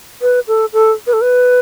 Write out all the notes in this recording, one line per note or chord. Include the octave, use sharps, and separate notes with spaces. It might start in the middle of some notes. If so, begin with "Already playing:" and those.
B4
A4
A4
B4
A4
B4